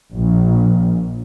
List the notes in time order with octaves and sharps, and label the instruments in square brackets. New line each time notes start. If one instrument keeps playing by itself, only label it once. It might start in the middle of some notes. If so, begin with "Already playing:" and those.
[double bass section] A#1